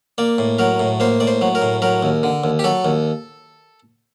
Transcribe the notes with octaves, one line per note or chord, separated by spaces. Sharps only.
A#3 D5
A2
F#3 A#4
A2
A#3 C5
A2 D5
C5
F#3
A#4
A2
F#3 A#4
D#2
D3
D#2
G4
F#3 A4
D#2